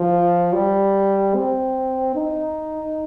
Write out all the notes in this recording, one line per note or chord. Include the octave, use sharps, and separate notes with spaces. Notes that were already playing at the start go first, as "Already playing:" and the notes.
Already playing: F3
G3
C4
D#4